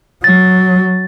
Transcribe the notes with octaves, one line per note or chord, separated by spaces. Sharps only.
F#3 A6